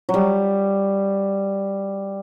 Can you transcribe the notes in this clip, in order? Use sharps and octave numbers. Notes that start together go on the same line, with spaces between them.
F#3
G3